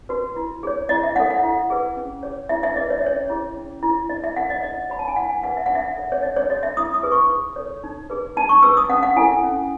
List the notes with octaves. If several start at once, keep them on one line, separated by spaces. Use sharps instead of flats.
F#4 B4
E4
G#4 C#5
E4 D#5
E5
A4 C#5 F#5
F#5
E4
G#4 B4
C#4
G#4 C#5
E4 E5
E5
G#4 B4 D#5
C#5
D#5
C#4 C#5
E4 G#4
C#4
E4
G#4
D#4 D#5
E5
A4 C#5 F#5
D#5
D#4 D#5
F#4 C#5 B5
A5
G#5
E4 F#5
G#5
G#4 B4 F#5
E5
D#4 F#5
E5
A4 C#5
C#5
D#4 D#5
C#5
F#4 A4 C#5 D#5
E5
E4 D#6
D#6
G#4 B4
C#6
D#4
A4 C#5
D#4
G#4 B4
D#4 A5
C#6
G#4 B4 E6
D#6
C#4 F#5
F#5
E4 A4 G#5
C#4